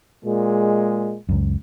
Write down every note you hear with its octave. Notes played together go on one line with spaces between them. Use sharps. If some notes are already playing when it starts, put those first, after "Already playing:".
A#2 G#3
C#2 F#2